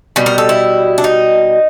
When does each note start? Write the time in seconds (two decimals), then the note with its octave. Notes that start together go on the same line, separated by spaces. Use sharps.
0.16 B2 G3
0.26 A#4
0.38 A4
0.49 E4
0.98 D4
1.04 D#4